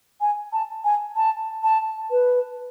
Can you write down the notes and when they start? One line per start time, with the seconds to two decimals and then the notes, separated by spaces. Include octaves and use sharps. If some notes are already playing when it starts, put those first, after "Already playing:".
0.21 G#5
0.53 A5
0.84 G#5
1.16 A5
1.63 A5
2.11 B4